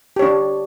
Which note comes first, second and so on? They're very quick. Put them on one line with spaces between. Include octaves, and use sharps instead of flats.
G4 C#5 D4